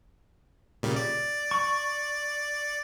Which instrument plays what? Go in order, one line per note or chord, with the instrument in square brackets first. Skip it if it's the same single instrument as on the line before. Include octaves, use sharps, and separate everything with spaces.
[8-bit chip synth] A#2 C#3 G3
D5
[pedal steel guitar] C#6